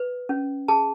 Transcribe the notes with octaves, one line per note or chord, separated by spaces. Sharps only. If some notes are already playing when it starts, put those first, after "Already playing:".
Already playing: B4
C#4
G#4 A5